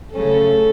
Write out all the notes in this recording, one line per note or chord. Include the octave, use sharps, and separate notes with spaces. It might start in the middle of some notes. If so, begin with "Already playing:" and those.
C#3 F#3 A3 C#4 A4